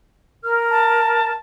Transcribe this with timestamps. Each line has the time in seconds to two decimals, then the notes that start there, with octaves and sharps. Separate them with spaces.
0.44 A#4 F6
0.71 A5